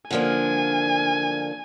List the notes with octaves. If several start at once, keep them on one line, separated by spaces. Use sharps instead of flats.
D3 F3 A#3 D4 G#5